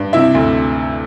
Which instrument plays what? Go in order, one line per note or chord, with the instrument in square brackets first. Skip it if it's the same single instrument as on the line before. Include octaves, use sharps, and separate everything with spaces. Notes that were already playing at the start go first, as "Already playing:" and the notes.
Already playing: [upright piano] G2
C3 E4 E5
D2